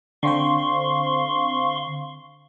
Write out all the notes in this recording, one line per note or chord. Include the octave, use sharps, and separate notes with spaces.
D3 C4 C5 F5 C6 C#6